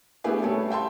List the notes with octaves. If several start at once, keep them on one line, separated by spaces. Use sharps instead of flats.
A3 B3 D4 E4 G4 G#4
G3 A3 C#4 A4
E5 G5 A5 C6